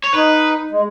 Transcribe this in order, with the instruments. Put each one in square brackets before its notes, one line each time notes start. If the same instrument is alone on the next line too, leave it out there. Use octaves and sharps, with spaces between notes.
[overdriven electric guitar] C#5
[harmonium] D#4 [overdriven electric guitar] B4
[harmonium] G#3